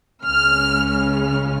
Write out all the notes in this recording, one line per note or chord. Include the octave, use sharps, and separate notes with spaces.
C#2 C#3 G#3 C#4 F6
F6